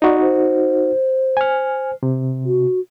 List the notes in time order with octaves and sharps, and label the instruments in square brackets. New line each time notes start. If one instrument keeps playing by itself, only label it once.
[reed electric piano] D#4 F#4 [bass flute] D5
[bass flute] C5
[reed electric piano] G#5 F6
C3
[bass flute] F#4